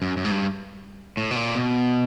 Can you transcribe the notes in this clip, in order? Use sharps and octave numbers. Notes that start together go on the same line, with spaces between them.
F#2
F#2
G#2
G2
A2
B2
A#2
B2